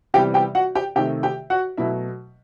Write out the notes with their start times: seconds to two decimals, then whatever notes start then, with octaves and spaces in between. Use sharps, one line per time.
0.14 C3 E3 G3 B3 G4 G5
0.34 G4 G5
0.55 F#4 F#5
0.75 G4 G5
0.96 C3 D#3 A3 G4 G5
1.23 G4 G5
1.50 F#4 F#5
1.77 B2 F#3 A3 E4 E5